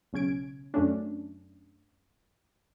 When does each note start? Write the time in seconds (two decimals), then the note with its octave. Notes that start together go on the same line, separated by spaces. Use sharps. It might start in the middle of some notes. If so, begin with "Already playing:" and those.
0.13 B1 C#3 C#4 G#6 D7
0.74 F#2 A3 C#4 D4